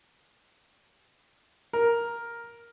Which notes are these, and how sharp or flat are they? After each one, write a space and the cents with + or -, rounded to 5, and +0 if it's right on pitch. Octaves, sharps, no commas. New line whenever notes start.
A#4 +5